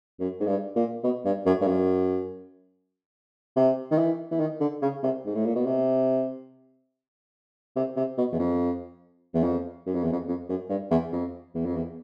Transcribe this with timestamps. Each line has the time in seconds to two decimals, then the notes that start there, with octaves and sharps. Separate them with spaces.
0.20 F#2
0.40 G#2
0.47 G2
0.76 A#2
1.04 B2
1.25 G2
1.46 F#2
1.61 G2
1.67 F#2
3.56 C3
3.91 D#3
3.98 E3
4.31 E3
4.40 D#3
4.60 D3
4.82 C#3
5.03 C3
5.26 G#2
5.35 A2
5.46 A#2
5.55 B2
5.66 C3
7.76 C3
7.97 C3
8.17 B2
8.32 E2
8.39 F2
9.35 E2
9.43 F2
9.86 F#2
9.94 F2
10.04 E2
10.12 F2
10.28 F2
10.49 F#2
10.69 G2
10.90 E2
11.12 F2
11.54 E2
11.65 F2
11.76 E2